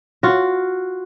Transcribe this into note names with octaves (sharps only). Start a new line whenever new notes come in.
F4 F#4